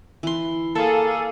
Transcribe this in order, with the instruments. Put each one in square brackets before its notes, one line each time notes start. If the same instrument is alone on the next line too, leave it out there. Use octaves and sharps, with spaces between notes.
[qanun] E3 C6
[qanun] A#3 [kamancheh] G#4 F5 [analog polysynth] A4